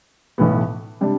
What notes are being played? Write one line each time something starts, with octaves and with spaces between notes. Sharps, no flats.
B1 A2 E3 B3
C3 G3 D4